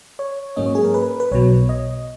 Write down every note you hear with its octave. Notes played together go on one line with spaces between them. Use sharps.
C#5
G#2 F#3 A#3 C#4 D#5
C#5
G#4
A#4
B4
B4
B1 B2 F#3 C#5
D#5